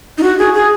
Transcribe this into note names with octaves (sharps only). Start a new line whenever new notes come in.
D#4
F#4
G#4
G#4